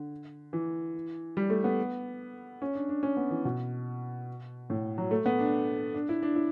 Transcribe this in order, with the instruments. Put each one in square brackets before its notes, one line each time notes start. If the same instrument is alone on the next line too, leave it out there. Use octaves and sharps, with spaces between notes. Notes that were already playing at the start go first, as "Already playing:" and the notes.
Already playing: [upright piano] D3
E3
G3
A3
B3
C#4
D4
D4
C#4
B3
E3
B2
A2
F#3
A3
B3
D4
D4
E4
D4
E4